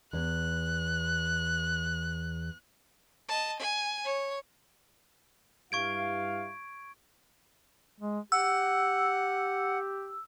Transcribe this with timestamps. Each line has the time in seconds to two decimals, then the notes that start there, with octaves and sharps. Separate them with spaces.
0.13 E2 F#6
3.29 D#5 A5
3.60 G#5
4.04 C#5
5.72 G2 E4 F5 C#6 G#6 D7
8.00 G#3
8.32 G4 F#5 E6